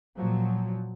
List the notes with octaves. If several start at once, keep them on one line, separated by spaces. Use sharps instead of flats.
A#2 F3 F#3